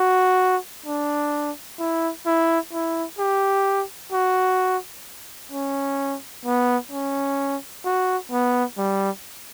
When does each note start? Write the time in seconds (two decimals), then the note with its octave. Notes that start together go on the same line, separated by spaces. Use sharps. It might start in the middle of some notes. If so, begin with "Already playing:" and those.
Already playing: F#4
0.86 D4
1.79 E4
2.26 E4
2.72 E4
3.19 G4
4.12 F#4
5.52 C#4
6.45 B3
6.91 C#4
7.85 F#4
8.31 B3
8.78 G3